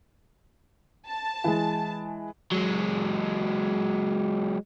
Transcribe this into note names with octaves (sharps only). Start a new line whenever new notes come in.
A5
E3 G#3
F#3 G#3